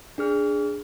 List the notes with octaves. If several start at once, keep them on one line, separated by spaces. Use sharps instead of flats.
D4 G#4 F6